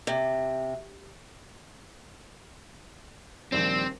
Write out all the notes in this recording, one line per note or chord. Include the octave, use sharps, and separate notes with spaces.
C3
A#1 D#2 G3 C4